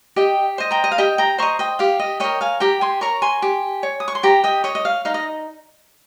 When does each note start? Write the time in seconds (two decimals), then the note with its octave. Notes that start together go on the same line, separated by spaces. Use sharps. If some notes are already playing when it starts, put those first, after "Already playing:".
0.16 G4 D#5 G5
0.58 C5 D#5
0.71 G5 A#5
0.84 D#5
0.91 F5
0.98 G4 D#5 G5
1.18 G5 A#5
1.38 C5 D#5 A#5 C#6
1.59 D#5 G5
1.79 G4 F5
1.99 D#5
2.20 A#4 C#5 D#5 G5
2.41 F5 G#5
2.60 G4 G5 A#5
2.81 G#5 C6
3.01 A#4 C#5 A#5 C#6
3.22 G#5 C6
3.42 G4
3.83 C#5
4.00 D#6
4.08 C#6
4.15 C6
4.23 G4 G5 A#5
4.44 D#5 G5
4.64 C#5 D#5
4.75 D#5
4.85 F5
5.05 D#4 F5
5.14 D#5